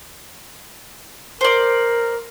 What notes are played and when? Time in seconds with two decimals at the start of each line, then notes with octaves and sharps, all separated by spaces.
1.41 A#4 C5 D5